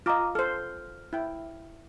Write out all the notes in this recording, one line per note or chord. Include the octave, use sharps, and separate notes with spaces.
F4 D#5 A#5 D6 F6
A4 C5 F6
E4 G5